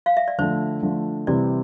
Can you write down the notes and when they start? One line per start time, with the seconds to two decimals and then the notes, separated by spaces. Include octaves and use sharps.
0.06 F5
0.17 E5
0.28 D5
0.38 D3 F3 A3 C5
0.82 D3 F3 A3
1.27 C3 E3 G3 C4 D5